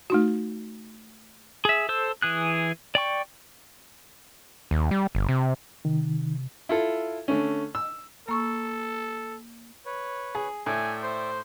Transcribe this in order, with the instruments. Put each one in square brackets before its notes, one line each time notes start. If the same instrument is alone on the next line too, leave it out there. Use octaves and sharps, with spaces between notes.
[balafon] A3 D#4 F#4
[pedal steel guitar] G#4 E5
A4 C5 E6
E3 G#4 F#6
D5 G5 C#6
[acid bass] D#2
G3
G1
C3
[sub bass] C3 [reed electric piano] D#3
[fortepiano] E4 F4 A4
D3 A3 C#4
E6
[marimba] A#3 C#6 E6 [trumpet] A4
[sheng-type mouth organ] B4 C#5
[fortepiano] G#4
[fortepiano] A2 [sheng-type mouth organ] D5 E5 G5 [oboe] G#5
[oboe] C5